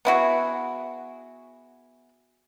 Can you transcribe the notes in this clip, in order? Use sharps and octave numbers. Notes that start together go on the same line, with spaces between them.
B3 E4 F#4 G#4